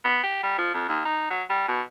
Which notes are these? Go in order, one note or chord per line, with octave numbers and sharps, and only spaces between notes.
B3
G4
G3
F3
F2
D#2
D#4
F#3
G3
B2